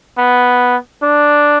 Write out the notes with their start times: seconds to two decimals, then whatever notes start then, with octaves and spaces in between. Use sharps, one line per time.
0.18 B3
1.03 D4